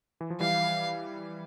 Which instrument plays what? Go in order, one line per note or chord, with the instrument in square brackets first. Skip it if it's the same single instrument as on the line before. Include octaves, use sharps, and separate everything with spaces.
[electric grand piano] E3
F3
[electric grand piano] E3 G3 [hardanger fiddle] F5